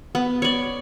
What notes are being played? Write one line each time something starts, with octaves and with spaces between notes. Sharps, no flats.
B3
C#5 D5